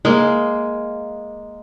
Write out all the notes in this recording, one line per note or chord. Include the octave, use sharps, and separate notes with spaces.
G#3 A#3